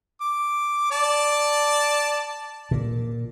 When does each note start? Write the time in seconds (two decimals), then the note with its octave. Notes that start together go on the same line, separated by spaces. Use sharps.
0.21 D6
0.92 D5 A5
2.71 A#2